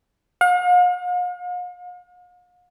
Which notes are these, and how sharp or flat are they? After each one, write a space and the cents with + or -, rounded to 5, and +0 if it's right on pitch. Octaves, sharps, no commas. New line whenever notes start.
F5 +45